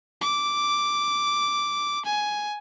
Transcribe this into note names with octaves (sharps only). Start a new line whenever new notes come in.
D6
G#5